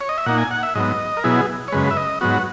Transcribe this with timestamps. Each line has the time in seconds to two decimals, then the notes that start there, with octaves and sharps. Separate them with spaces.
0.01 C#5
0.09 D#5
0.18 E5
0.26 A#2 A#3 D#4 F#5
0.38 G#5
0.51 F#5
0.63 E5
0.75 G#2 F#3 B3 D#5
1.17 A#4
1.24 B2 F#3 B3 E4 G#4
1.68 C#5
1.72 F#2 C#3 G#3 B4
1.91 E5
1.97 D#5
2.21 G#2 F#3 B3 F#4